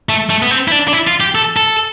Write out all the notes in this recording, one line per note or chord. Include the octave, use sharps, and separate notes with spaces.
A3
A3
B3
C4
E4
D4
D4
E4
F4
G4
A4
A4